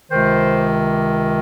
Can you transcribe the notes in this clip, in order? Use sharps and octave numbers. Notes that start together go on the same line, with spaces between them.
C#2 C3 D#3 C5